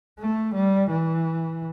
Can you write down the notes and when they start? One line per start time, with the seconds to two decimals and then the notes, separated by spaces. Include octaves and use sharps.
0.19 A3
0.54 G3
0.90 E3